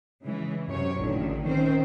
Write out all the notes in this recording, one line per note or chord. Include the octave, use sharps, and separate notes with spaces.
C#3 E3 G#3
F#2 C3 C#5
A1 A#2 D3 D#3
D#3 C4 C#4 C5